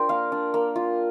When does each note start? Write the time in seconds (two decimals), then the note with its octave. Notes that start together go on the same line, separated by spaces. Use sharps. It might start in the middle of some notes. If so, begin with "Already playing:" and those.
Already playing: D4 F4 A#4 C5 D5 G5 C6
0.09 A#3 F5
0.32 D4
0.54 A#3
0.76 F4